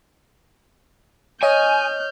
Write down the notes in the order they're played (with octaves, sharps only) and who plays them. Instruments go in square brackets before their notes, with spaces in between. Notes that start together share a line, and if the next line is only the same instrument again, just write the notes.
[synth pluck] C#5 D#5 [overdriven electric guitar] G#5 [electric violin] F6 G6